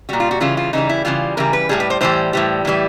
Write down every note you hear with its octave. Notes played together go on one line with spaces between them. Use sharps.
A#2 G3 F#4
F4
F#4
C#3 E3 G3 F4
F4
C#3 E3 G3 D#4
E4
C#3 E3 G3 F4
C#3 E3 G3 A#4
B4
A2 E3 G3 G#4
B4
C5
A2 E3 G3 C5
A2 E3 G3
A2 E3 G3